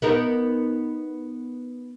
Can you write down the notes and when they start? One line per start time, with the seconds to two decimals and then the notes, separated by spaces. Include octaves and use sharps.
0.02 B3 D#4 A#4